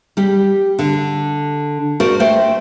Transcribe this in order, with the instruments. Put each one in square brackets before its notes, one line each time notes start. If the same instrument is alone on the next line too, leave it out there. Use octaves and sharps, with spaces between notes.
[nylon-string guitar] G3 G4
D3
F#4 A#4 C5 D5
A3 C5 G5